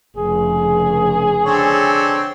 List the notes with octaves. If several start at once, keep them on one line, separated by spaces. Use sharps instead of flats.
F1 C#3 G#4
D3 C4 C#5